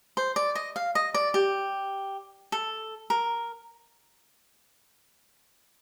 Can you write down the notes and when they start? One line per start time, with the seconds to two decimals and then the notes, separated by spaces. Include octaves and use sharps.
0.17 C5
0.36 D5
0.55 D#5
0.76 F5
0.95 D#5
1.14 D5
1.34 G4
2.52 A4
3.10 A#4